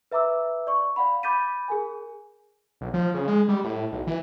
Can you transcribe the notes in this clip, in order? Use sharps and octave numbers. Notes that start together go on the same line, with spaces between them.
B4 E5 A#5 D6 E6
D5 C#6
D5 F5 F#5 B5
B5 D6 G6 A6 B6 D#7
G#4 A#4 G#5
B1
F3
C#3
G#3
G3
A2
B1
E3